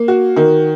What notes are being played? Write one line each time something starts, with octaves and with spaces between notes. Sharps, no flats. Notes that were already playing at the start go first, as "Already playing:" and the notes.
Already playing: A#3
F#4
D#3